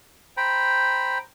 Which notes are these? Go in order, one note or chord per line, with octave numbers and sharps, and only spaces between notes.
C5 G5 A#5 B5